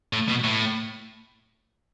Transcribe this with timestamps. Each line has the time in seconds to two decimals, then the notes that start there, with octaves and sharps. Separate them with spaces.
0.13 A2
0.29 B2
0.44 A2